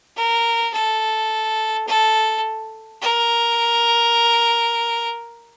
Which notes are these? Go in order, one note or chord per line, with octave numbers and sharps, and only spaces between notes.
A#4
A4
A4
A#4